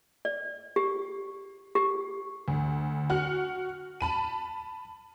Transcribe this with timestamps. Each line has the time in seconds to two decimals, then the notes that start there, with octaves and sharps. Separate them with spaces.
0.25 D5
0.76 G4
1.75 G4
2.48 D2
3.10 F#4 F#5 F6
4.01 A5 B5 D#7